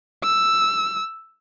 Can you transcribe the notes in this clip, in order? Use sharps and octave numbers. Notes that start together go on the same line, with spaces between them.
E6